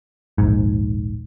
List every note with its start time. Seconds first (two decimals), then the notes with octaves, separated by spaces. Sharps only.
0.38 D#1 A#1 G#2